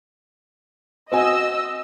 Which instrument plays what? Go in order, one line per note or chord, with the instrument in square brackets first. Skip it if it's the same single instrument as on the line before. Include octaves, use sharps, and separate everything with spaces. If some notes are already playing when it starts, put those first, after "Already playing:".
[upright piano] C4 F#4 G#5 [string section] D#5 E6